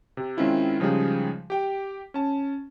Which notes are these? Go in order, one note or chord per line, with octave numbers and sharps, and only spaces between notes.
C3
D#3 G#3 C4 C#4 E4 F4
C#3 F3 G3 G#3 D#4 G#4
G4 G5
C#4 A5